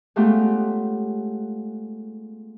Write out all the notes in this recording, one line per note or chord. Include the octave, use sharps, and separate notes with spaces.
G#3 A3 B3 C#4 F4 G4